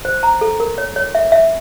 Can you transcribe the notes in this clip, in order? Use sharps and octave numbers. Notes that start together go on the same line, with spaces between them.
C5
A#5
A4
A#4
C#5
C#5
E5
E5